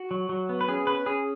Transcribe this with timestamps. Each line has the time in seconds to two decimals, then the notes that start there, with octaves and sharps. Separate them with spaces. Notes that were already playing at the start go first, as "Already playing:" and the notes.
Already playing: F#4
0.11 F#3
0.29 F#3
0.49 B3
0.61 B4
0.68 C#4 G#4
0.87 C#4 B4
1.06 C#4 G#4